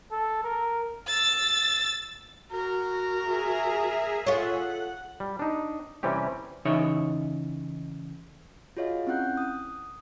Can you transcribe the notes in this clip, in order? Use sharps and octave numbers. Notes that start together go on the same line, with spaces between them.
A4
A#4
E6 A6
F#4 A#4
G#4 E5
F4 A4 C#5 F#5
G3
D4 D#4
C3 E3 G3 C4 C#4 G4
C#3 E3 D#4 C#5 E5
F4 F#4 G#4 C#5 D#5 F5
C4 C#4 E4 F#5 F#6 G6
D#6